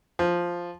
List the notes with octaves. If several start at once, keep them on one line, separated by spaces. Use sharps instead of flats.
F3